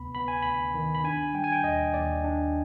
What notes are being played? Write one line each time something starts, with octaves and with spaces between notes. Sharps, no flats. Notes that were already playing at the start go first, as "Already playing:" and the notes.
Already playing: D2 C3 B3 B5
B3 B5
G#5
D2 B5
D#3
B5
D4 G#5
G3 G5
G#5
G5
D#2 D#5
D#2 D5
D4